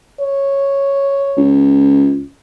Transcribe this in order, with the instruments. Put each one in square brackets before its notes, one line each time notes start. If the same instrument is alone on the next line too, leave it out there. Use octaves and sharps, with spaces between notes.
[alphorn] C#5
[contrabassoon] C#2